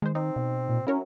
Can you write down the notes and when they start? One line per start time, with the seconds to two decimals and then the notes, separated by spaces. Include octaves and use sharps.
0.02 D#3 G#3 C5
0.15 C4 D#4
0.36 B2
0.68 A#2
0.87 F#3 C#4 E4 A#4 C#5